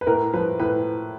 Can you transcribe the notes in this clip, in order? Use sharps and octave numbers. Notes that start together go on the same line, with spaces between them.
B4
A2 A#4
F3 B4
A2 B4